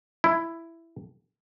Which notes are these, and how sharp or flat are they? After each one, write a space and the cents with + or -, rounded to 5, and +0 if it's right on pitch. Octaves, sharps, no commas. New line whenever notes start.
E4 +10